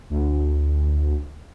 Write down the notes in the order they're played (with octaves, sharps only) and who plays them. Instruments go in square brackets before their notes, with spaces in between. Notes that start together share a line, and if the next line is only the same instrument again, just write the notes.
[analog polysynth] D2